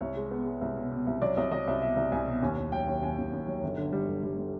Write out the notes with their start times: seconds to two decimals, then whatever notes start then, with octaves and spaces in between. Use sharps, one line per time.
0.01 C2 C#5
0.16 G#3
0.31 B3
0.46 G#3
0.61 C2
0.77 B2
0.92 B2
1.07 C2
1.22 F#3 D5
1.37 C2 D#5
1.51 F#3 D#5
1.68 C2 E5
1.82 B2 E5
1.96 C2
2.12 C2 G#5
2.27 B2
2.42 D#2 G#5
2.57 D#2
2.72 F#3 G5
2.87 D#2
3.02 D#2 G#5
3.18 D#2
3.33 D#2
3.48 F#3
3.63 G1
3.78 D3
3.92 G3
4.08 G1
4.23 G3
4.38 G3